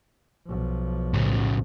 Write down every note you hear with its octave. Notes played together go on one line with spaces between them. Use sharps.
B1 F3
A2 C#3